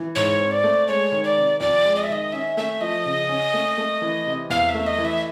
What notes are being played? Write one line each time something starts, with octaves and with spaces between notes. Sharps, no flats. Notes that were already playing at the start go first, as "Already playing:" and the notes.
Already playing: E3
G#2 C#5
C4
D5
A3
G#3 C#5
D#3
D5
C3
F2 D5
G#3
D#5
E5
D#3 D#5
C#4 E5
A3 E5
F3 D#5
C#3
C#4
A3
A3
E3
C3
E2 F5
E5
A3
D#5
E3
E5